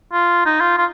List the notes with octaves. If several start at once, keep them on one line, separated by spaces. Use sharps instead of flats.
F4
D#4
F4
F4